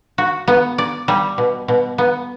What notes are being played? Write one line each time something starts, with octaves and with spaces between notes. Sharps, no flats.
F#4
B3
D5
G3
B2
B2
B3